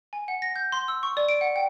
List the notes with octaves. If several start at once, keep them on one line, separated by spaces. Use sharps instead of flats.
G#5
F#5
A#6
G6
C6
E6
C#6
D5
D7
F#5
G5